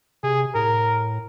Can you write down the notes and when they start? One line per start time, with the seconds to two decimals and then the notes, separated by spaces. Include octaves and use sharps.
0.23 C3 G#4
0.55 A2 A#4